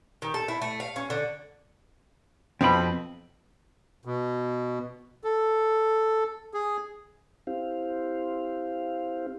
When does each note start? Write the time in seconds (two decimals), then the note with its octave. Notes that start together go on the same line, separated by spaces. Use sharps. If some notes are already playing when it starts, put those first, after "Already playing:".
0.22 D#3
0.34 A4
0.48 E4
0.62 A3
0.80 F5
0.96 C#4
1.10 D3
2.61 F2 B2 C4 B5
4.05 B2
5.24 A4
6.54 G#4
7.47 C4 E4 G4 C5 F5